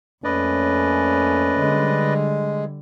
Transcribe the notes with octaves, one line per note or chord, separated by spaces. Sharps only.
F2 A3 A#3 C#4 B4 D5 D#5
D3 G3 G#3